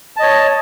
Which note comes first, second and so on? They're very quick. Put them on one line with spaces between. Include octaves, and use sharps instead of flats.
A5 D#5 C#5